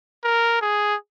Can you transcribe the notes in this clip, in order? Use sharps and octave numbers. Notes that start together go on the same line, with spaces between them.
A#4
G#4